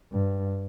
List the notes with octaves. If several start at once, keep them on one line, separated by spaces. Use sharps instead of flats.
G2